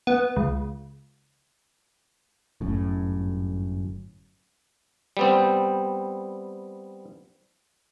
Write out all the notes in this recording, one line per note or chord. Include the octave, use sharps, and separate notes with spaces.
B3
C#2
G1 F#2 A2
G3 B3 C4